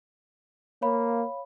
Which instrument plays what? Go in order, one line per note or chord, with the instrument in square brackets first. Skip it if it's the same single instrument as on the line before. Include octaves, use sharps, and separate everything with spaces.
[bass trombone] A#3 [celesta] C#5 F5 B5